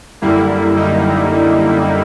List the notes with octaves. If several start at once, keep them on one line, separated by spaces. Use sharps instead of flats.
F#2 D3 G3 A#3 E4
D#4